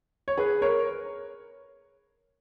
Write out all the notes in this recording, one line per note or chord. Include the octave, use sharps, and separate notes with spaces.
C#5
G#4 B4
A#4 C#5